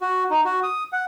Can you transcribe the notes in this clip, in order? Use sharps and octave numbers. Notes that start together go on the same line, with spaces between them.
F#4
D#4
F#4
D#6
F#5